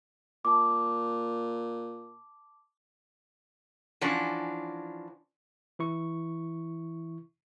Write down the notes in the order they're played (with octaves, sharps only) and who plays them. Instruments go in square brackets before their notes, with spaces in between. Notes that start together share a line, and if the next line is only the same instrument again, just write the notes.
[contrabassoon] A#2 [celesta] A5 D6
[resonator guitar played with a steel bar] E3 F3 C#4 D4 F#4
[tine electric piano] E3 E4 C#6